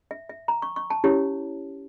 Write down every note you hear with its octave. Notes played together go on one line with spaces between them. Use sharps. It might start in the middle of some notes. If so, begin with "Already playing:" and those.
E5
E5
A#5
C#6
C#6
A5
C#4 E4 G4 C#5